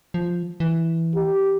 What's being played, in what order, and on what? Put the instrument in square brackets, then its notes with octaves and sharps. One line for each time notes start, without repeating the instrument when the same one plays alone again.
[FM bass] F3
E3
[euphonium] G4